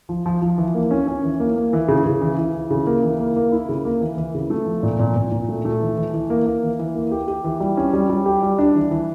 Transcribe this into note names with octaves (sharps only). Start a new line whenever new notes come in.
F3
F3
F3
E3
A#3
C#4
C#4
E3
A#3
A#3
E3
C#3
C#3
E3
E3
E3
C#3
A#3
E3
A#3
A#3
E4
C#3
A#3
E3
E3
C#3
A3
F3
A#2
A#2
A#2
A#2
A3
A3
E3
E3
E3
A#3
A#3
E3
E3
A#3
G4
G4
E3
G3
C#4
G3
G3
G4
G3
D4
E3
E3